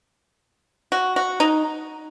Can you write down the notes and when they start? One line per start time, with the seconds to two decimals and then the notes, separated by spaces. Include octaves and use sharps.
0.92 F#4
1.16 F#4
1.40 D#4